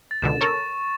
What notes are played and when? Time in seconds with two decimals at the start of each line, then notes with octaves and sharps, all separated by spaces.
0.11 A6
0.22 C#2 B2 D3 E7
0.41 A4 A#4 C#5 C#6 E7